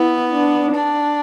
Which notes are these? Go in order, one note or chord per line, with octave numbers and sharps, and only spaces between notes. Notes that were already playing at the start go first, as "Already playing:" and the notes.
Already playing: B3 E4
D4
D4